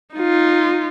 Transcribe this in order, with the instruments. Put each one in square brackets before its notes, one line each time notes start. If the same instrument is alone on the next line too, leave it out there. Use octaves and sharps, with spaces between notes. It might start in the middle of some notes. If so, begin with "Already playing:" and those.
[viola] D#4 F4